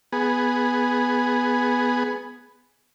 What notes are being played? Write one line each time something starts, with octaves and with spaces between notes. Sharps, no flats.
B3 G#4